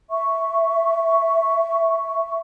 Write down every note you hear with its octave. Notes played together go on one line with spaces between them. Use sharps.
E5 C#6